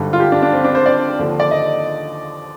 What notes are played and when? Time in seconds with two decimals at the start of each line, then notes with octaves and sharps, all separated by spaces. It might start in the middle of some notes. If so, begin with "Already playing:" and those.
Already playing: G#1 G2 D3
0.13 F4
0.20 G4
0.32 D4
0.42 D4
0.53 C4
0.64 D4
0.75 C5
0.86 D5
1.19 D#2 D3 F3
1.40 D5
1.51 D#5